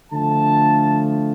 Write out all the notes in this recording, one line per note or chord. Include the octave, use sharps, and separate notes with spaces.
D3 F3 A3 A5